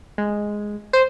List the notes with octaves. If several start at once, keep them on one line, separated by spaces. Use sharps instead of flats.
G#3
C5